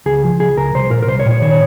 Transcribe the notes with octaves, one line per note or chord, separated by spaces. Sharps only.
C#2 G#4
F3
C#2 G#4
C#2 A#4
C2 C5
A#2 A#4
A#4
C2 C5
C#5
A#2
C#5
D#3 C#5